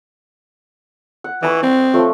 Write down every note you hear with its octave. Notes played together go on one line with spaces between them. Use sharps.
F#5
E3 D#5 B5 C#6
C4 C#6
F3 A3 C#5